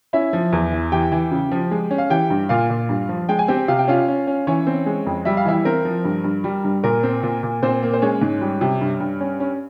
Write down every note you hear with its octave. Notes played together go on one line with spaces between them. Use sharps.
C#4 E4 E5
F3
E2
E3
E3 G4 G5
E3
C#3
F3
G#3
C#4
F5
E3 G4 G5
G2
A#2 F4 F5
A#2
G2
F3
G#3 G5
G#5
C4 G4 G5
C3 F5
G5
C#4 F4 F5
C#4
C#4
E3 C#4 C#5
C4
G#3
F2
G3 E5
F5
E3 E4 E5
C4 A#4
F3
G2
G2
G3
G2
A#2 A#4
C4
A#2
A#2
A#2 C4 C5
A#3
C5
G#3 C#4 C#5
G#2
G3
C3
G2
G2
C#4
C#4